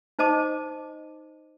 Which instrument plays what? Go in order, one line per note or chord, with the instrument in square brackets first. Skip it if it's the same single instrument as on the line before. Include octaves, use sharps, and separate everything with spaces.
[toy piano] D#4 C5 D#5 A5 D6